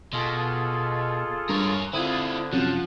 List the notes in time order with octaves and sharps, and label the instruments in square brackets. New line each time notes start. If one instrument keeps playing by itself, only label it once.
[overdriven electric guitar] B2 [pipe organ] F4 G#4 A4
[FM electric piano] G2 [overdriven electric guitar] A#4 C#5
[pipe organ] D3 [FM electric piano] C4 D#6 G#6 [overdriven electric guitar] E4 F4
[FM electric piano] F#2 C3 F#3 [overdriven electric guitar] F3 [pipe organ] F#5 F#6